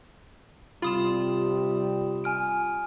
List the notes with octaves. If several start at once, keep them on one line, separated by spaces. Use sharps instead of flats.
C3 G3 F4 B5 D#6 E7
G#5 F6 D7